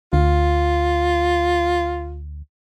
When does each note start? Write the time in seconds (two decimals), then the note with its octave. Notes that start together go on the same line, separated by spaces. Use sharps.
0.13 D2 F4